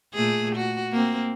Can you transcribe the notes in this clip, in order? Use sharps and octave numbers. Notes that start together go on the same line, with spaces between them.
A#2 A3 G#4
F#4
A#3 C4